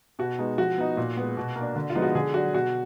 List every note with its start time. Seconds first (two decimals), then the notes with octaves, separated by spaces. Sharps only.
0.19 B2 F#4
0.38 G#3 B3 D#4
0.58 F3 F#4
0.78 B3 D#4
0.97 A#2
1.17 G#3 B3
1.37 B2
1.55 A#3
1.61 D4
1.76 D3
1.90 F4
1.95 F3 G#3 B3 D#4
2.02 F#4
2.15 D3 G#4
2.34 F#3 D4 F#4
2.54 B2 F#4